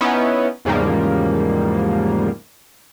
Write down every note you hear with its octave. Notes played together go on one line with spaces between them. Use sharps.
B3 C#4 D#4 E4
E2 G#2 C#3 F3 G3 A#3